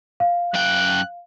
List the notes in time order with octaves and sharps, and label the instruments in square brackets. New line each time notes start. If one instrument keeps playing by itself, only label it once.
[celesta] F5
[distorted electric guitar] F#2 G5 [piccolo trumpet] F#6